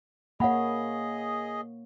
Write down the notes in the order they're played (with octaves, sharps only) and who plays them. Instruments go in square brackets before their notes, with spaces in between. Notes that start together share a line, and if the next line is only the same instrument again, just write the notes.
[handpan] A#3 C#5 [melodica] G#4 D#5 [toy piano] F5 F#5 B5